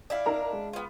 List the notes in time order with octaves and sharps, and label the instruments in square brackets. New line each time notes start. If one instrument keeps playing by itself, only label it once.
[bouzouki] D4 E4 F5
[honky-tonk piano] D#4 A#4 A#5
G#3
[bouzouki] B3 F4